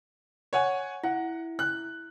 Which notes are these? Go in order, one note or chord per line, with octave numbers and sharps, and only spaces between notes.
C#5 F#5 G#5
E4 F#5
F#6